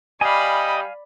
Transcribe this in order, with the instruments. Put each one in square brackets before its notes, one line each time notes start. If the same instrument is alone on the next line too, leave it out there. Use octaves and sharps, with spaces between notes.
[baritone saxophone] G3 [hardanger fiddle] D5 B5 [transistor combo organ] D#5 [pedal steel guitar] F5 G#5